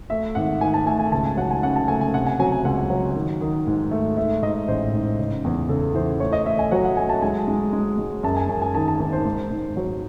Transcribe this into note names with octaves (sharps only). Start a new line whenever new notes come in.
A3 E5
G#1 F#5
D#3 G#5
A5
A3 G#5
G#5
C#2 A5
G#5
F#3 F#5
G#5
C#3 F#5
A5
A3 G#5
G#5
C3 F#5
G#5
F#3 G#5
G#5
C#2 F#5
F#3
D#3
D#3
G#2
A3
A3 E5
G#2 D#5
A1 C5
G#2
C#3
E2
C#3 A4
E3 C5
A3 C#5
D#5
A3 E5
G#5
F#3 F#5
F#5
A3 G#5
A5
G#3 G#5
G#3
G#3
G#3
F#2 A5
G#5
F#2 G#5
G#5
D#3 A5
A5
G#1
C5
G#2
G#2
F#3